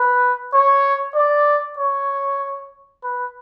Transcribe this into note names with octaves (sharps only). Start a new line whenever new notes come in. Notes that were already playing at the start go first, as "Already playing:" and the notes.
Already playing: B4
C#5
D5
C#5
B4